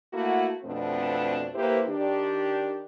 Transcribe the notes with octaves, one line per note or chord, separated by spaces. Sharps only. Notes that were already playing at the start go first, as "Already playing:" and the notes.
A3 A#3 E4 F#4
F2 B2 A3 B3 C4 D4
A#3 E4 G4 B4 C5
D#3 D4 G4